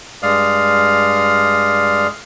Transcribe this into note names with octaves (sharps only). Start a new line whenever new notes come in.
G2 G#3 D5 F5 D#6 F6